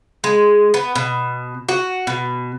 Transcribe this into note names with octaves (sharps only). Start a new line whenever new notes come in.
G#3
B3
B2
F#4
B2